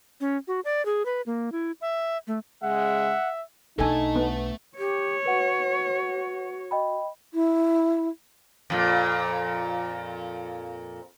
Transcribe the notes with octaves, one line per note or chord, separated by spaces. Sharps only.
C#4
F#4
D5
G#4
B4
A#3
E4
E5
A3
C#3 G#3 E5 F#5
B1 A3 D4 D#4 A4 G#5 A5
B3
G4 C#5
F#4 B4 F#5
D#5 G5 B5
E4
F2 A#2